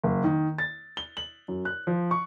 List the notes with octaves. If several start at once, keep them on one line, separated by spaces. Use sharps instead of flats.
F#1
D#3
A6
G7
F#7
F#2
F#6
F3
C#6